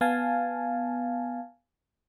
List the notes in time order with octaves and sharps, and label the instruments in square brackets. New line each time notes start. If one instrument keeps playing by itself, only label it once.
[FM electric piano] B3 F5 G#5 A5